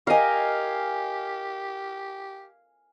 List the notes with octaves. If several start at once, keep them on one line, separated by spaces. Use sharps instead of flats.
G4 A#4 D#5 F5 G#5